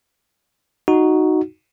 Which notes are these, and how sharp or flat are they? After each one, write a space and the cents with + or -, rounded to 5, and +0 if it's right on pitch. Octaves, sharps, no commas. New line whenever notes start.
D#4 +0 F#4 +0